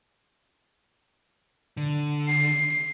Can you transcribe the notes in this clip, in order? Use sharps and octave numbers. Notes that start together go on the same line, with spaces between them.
D3
C7